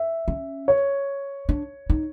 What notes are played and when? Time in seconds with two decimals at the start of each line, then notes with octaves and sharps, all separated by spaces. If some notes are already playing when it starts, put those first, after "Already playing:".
Already playing: E5
0.28 C#4
0.68 C#5
1.49 D4
1.90 D#4